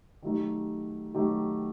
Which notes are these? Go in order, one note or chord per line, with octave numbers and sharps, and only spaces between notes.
D#3 F#3 A3 D#4 G4
D#3 F#3 A3 D#4 G4